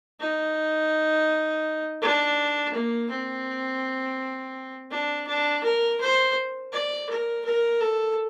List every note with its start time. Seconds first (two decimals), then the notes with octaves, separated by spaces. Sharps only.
0.20 D#4
2.02 D4
2.74 A#3
3.10 C4
4.91 D4
5.27 D4
5.64 A#4
6.00 C5
6.72 D5
7.09 A#4
7.45 A#4
7.81 A4